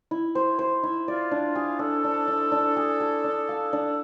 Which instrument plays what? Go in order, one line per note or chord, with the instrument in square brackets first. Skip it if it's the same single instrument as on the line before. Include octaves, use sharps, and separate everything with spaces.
[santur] E4
C5
C5
E4
[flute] F4 [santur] D5
[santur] D4
G#4
[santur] D4 [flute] A4
[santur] D4
D4
D4
G#4
G#4
D4
F5
D4